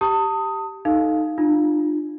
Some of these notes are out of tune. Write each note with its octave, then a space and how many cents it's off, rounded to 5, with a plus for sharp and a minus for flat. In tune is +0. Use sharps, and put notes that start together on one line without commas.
G4 +0 A5 +35 D#6 +10
D#4 +0 A4 +0 F5 +0
D4 +45 F4 +0